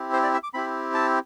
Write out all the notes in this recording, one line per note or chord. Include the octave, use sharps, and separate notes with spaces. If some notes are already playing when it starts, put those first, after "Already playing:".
Already playing: C4 E4 G4
C5
D5
E5
D6
C4 E4 G4 B5
A5